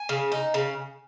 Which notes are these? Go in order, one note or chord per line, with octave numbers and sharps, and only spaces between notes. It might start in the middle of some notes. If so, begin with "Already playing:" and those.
Already playing: G#5
C#3
D#4
C#3